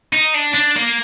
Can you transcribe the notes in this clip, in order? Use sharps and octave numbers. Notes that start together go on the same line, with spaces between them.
D#4
D4
D4
A#3